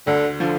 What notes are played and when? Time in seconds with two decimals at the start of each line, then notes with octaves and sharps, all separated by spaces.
0.07 D2 D3
0.40 D3 F3